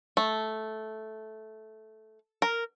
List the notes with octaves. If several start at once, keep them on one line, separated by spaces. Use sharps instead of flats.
A3
A#4